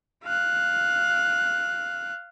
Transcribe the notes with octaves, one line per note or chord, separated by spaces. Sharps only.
F5 F#6